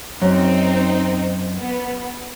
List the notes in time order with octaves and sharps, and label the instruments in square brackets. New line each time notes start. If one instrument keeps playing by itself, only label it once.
[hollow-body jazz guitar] F#2 [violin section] C4 D#4
[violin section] B3